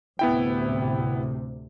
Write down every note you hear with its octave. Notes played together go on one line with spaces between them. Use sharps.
D2 A2 C3 B3 E4 G5